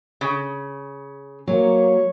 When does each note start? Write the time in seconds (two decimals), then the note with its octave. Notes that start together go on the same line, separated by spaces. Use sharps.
0.21 C#3
1.48 F#3 A#3 C#5